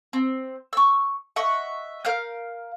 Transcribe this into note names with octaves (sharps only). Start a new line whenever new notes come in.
C4
C#6 E6
D#5 E5 F#5 C#6
A#4 F5 F6 G6